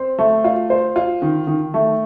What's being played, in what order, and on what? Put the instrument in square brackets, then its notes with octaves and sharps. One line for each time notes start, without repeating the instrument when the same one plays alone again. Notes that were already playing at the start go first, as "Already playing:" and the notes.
Already playing: [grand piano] C4 C5
A3
F4
C5
F4
D#3
D#3
A3